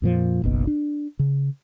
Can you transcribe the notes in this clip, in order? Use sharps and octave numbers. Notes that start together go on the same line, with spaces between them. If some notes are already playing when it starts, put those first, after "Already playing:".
F2 A#2 F3
F#1 B1 B2
D4
C#3